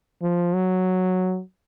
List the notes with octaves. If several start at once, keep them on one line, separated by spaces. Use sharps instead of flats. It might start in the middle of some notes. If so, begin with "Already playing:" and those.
F3
F#3